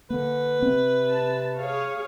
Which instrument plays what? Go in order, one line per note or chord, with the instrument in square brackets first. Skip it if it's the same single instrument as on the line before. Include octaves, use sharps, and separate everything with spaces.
[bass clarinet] D3 [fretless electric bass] A#3 [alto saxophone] B4
[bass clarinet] C3 [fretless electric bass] C4
[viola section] A5
G#4 C#5 F5